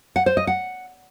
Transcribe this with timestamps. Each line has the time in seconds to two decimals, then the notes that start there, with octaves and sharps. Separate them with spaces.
0.16 F#5
0.26 C5
0.37 D#5
0.47 F#5